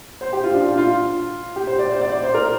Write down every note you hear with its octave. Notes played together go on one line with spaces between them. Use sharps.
C5
G4
F4
D4
F4
F4
G4
C5
D5
C5
D5
D5
C5
A#4